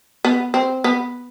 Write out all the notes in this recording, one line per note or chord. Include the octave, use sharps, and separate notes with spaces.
B3
C4
B3